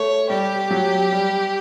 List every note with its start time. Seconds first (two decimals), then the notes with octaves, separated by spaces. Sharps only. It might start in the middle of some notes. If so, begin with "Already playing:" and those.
Already playing: A3 C#5
0.29 G3 G4
0.71 F#3
1.12 G3